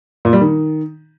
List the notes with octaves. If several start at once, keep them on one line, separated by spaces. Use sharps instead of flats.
A#2
G3
D#3